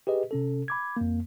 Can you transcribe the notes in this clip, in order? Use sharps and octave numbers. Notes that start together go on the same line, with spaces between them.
G4 G#4 B4 D#5
C3 C#4 A4
B5 D6 G#6
F2 A#3